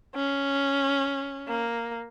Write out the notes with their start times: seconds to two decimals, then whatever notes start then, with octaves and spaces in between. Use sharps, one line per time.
0.15 C#4
1.48 A#3